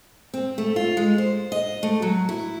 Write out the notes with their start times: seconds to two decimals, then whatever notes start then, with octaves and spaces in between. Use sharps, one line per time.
0.34 C4
0.58 A3
0.76 F4
0.97 G#3
1.18 C5
1.52 D#5
1.83 A3
2.02 F#3
2.29 E4